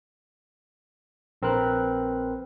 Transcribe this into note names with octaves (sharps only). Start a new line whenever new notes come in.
A#1 C4 A#4 B4 F#6